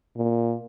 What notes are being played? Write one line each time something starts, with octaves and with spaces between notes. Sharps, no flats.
A#2